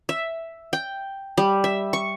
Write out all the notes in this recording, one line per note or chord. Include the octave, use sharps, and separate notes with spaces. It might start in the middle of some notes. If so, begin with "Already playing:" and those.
E5
G5
G3
E5
C#6